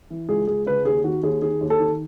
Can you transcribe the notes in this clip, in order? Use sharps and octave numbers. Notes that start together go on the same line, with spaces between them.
E3
C#2 G#4
C#2 G#4
C#3 B4
D#2 G#4
D#3 F#4
D#2 G#4
D#3 G#4
D#2
A4
D#3